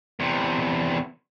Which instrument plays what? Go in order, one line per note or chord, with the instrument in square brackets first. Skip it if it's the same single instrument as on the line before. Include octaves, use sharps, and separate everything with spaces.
[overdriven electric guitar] E2 C3